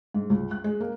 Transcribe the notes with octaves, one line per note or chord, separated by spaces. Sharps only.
G#2
C#2
F#6
G#3
A#3